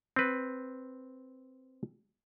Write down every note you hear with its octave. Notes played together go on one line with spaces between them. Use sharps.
C4 B4